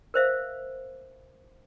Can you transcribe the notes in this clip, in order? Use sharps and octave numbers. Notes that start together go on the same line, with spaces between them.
A#4 C5 E5 F5